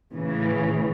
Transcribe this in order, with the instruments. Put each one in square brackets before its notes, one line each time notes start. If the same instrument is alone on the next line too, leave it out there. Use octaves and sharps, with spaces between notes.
[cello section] A2 C#3 E3